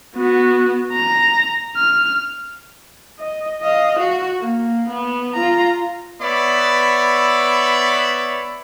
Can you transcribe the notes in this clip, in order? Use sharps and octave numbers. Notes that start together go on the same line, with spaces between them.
B3 F#4
A#5
F6
D#5
D#5 F5
F#4
A#3
B3
F4 A#5
B3 C#5 D5 E5 B5